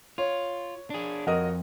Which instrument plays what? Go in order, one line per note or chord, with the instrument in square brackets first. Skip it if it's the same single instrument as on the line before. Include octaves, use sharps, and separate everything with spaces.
[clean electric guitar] F4 [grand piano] C#5
[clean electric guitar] D4 G#4
[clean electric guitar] F2 [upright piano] F#4 A#4 D#5